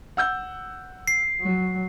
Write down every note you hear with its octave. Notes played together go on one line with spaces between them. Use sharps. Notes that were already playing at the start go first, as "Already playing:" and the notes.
F#5 E6 G6
C7
F#3